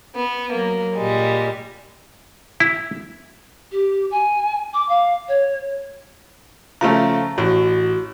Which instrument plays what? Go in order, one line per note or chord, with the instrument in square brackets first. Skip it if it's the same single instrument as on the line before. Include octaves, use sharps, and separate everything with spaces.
[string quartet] B3
F#3 A#3
A#2 G3 G#3
[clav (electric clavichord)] E4
[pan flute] G4
G#5
D6
F5
C#5
[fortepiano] C#3 F3 A3 [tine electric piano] A#5
[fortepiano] A1 [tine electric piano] F#4